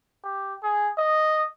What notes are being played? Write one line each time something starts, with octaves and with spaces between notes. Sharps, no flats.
G4
G#4
D#5